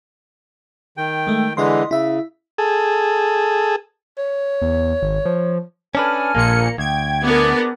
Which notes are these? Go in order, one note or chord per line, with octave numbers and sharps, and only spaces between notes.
D#3 G5
G#3 A3
D3 E3 G#3 E4 D#5 C6
C#3 E4 E5
G#4 A4
C#5
E2
G#1
F3
C#4 D4 A4 B4 G#5 F6
A#1 A#2 A#3 C#7
D2 G5 G#6
B3 D4 G#4 A#4 D6